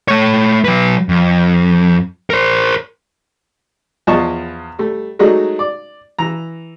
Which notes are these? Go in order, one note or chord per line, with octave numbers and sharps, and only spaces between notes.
A3 C#5
F#3 B4
F2
A#4 C5
E2 F3 F4 D#5 A5 C#6
G3 A3
F#3 G#3 A3 D#4 F#4
D5
E3 A#5